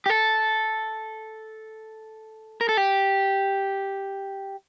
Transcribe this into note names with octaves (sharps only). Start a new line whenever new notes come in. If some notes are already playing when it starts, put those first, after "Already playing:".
G4
A4
A#4
A4
G4